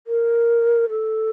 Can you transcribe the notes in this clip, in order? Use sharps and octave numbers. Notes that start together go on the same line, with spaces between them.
A#4
A4